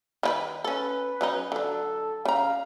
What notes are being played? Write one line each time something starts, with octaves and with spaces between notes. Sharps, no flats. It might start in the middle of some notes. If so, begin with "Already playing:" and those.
D#3 D#4 B4
C#4 A4 B4
F#3 C#4 D#4
D3 F#3 A4
C#3 F5 A#5